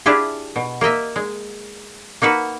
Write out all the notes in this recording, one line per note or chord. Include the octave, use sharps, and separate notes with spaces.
D4 E4 F4 G4 G#4
B2
A#3 A#4 D#5 E5
G#3
A#3 D#4 F#4 B4